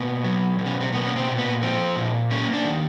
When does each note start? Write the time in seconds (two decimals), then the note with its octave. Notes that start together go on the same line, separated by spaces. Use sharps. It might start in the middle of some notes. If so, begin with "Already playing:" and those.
Already playing: B2 A#3 B3
0.24 F#3
0.59 B2
0.66 C#4
0.80 C4
0.92 A#3 B3
1.07 C#4
1.16 C4
1.28 A#2
1.38 B3
1.62 F3 C4
1.96 A#2
2.31 A#3 C#4
2.53 D4
2.65 D#3